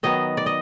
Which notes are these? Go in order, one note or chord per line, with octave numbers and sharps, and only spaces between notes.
D#3 F#3 B3 D#5
D5
D#5